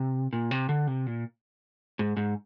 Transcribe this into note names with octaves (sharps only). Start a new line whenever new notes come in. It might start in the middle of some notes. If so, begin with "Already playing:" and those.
Already playing: C3
A#2
C3
D3
C3
A#2
G#2
G#2